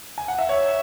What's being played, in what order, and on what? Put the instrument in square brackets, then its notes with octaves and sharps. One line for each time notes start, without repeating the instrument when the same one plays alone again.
[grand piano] G#5
F#5
E5
[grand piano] C#5 [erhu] E5